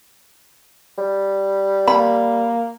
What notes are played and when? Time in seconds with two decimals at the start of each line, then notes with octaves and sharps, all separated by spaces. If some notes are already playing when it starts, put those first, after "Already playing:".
0.98 G3
1.88 A#3 B5